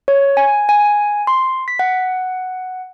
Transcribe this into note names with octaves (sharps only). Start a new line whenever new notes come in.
C#5
G#5
G#5
C6
B6
F#5